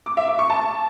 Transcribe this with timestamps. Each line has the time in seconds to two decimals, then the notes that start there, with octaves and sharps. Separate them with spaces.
0.06 D6
0.17 E5
0.28 D6
0.39 C#6
0.50 A5